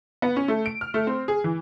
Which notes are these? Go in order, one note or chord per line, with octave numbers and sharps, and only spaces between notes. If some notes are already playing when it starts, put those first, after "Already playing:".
B3
C#4
A3
D7
F6
A3
C4
G#4
E3